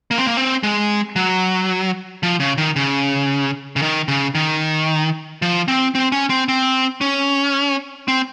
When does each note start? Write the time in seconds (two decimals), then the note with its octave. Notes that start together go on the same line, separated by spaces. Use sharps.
0.11 A#3
0.18 C4
0.26 A#3
0.37 C4
0.63 G#3
1.16 F#3
2.23 F3
2.40 C#3
2.58 D#3
2.76 C#3
3.76 C#3
3.82 D#3
4.08 C#3
4.35 D#3
5.42 F3
5.68 C4
5.95 C4
6.12 C#4
6.30 C4
6.48 C4
7.01 C#4
8.08 C4